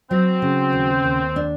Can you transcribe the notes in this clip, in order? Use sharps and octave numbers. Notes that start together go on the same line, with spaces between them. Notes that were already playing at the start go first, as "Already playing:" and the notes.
F#3 C4
C#3
D#2
D#2
D4